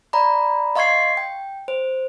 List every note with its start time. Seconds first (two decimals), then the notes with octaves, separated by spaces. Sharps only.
0.13 D5 A#5 B5
0.76 D#5 F5 C6 C#6 G#6 C7
1.17 G5
1.68 C5